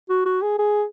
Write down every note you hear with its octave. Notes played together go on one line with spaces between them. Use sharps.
F#4
F#4
G#4
G#4